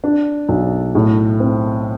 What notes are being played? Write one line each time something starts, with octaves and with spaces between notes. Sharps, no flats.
D4
B1
A2
C4